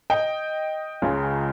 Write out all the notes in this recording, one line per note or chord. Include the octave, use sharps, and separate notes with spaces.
D#5 G5
C#2 C#3 G#3